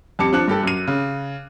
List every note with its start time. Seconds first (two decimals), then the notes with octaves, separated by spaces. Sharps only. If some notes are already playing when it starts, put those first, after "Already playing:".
0.19 F2 G3 A5 D6 C#7
0.33 F3 D4 F#6
0.48 G2 G4 A4
0.63 F#2 D#7
0.87 C#3